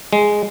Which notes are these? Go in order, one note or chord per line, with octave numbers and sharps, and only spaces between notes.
G#3